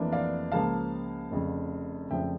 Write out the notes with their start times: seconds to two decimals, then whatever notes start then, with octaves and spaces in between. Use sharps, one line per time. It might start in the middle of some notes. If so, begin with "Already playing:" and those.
Already playing: F1 F2 E3 A#3 D4
0.12 D5 F5
0.52 C#2 C#3 F3 A#3 F5 A5
1.31 F1 F2 C#3
2.10 F1 F2 C#3 F3 E5 G5